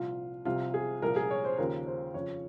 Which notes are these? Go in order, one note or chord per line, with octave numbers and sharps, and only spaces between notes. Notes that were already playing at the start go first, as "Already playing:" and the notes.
Already playing: C2 A#2 F3 F4
C2 C3 F3 F4
G#4
C2 A#2 F3 A#4
G#4
C#5
C5
D#2 C#3 F3 A#4
C5
F2 C#3 F3 C#5